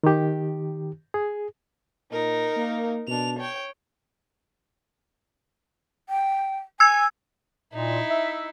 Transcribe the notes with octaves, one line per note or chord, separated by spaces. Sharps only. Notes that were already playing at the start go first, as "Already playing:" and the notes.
D#3 G4
G#4
A#2 D#4 A#4
A#3
B2 D4 F7
C#5 G5
G5
G#5 E6 G#6
A#2 D#4 E4
E5